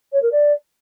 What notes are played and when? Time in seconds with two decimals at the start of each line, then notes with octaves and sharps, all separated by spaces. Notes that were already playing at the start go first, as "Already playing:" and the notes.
0.12 C#5
0.22 A#4
0.32 D5